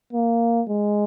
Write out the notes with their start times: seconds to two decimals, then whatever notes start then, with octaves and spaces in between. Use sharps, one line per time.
0.13 A#3
0.68 G#3